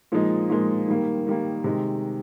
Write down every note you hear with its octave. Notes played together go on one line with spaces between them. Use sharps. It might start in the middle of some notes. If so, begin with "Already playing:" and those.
A#2 F3 G#3 D#4
A#2 F3 G#3 D#4
D#3 G3 A#3
D#3 G3 A#3
C3 D#3 G#3